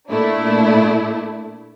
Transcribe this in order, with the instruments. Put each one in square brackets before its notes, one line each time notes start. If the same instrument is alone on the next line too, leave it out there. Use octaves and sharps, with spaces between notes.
[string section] A#2 A3 D4 E4